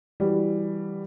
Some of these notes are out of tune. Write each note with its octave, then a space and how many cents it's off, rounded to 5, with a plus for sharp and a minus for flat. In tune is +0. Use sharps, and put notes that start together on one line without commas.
E3 +0 G3 +5 F#4 +10